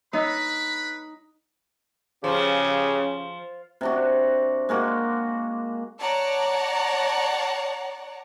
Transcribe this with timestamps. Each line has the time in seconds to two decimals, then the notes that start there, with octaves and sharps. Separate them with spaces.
0.13 D#4 B4 C#5 D#5 B5 E6
2.24 C#3 F3 C#4 G4 G#4
3.81 C3 D4 F#4
4.69 G#3 A#3 F#4 D6
6.00 C#5 D5 F#5 A5 A#5